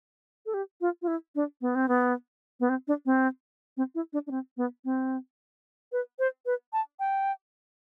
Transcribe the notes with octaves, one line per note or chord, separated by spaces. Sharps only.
A4
G4
F4
F4
E4
D4
B3
C4
B3
B3
C4
D4
C4
C4
E4
D4
D4
C4
B3
C4
B4
C5
B4
A5
G5